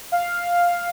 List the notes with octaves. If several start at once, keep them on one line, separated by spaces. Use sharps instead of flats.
F5